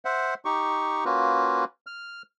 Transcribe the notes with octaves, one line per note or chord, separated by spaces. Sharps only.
C5 E5 F#5
D#4 G4 C#6
A#3 C#4 F4 F#4 B4
F6